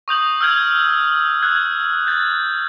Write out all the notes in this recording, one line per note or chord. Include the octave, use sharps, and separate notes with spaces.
C#6 D#6 G6 F#7
E6 F6 G6 G#6
E6 F#6 G#6
G6 A6